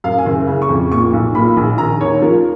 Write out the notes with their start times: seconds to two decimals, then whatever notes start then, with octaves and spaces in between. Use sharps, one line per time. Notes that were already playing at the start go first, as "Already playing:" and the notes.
0.04 F#2 F5
0.18 G#5
0.26 F#1
0.47 C#3
0.62 C#6
0.69 F2
0.92 A#2 C#6
1.13 B1
1.35 A#2 B5
1.57 A#1
1.78 D#3 A#5
2.01 D#2 C#5
2.22 F3 A#4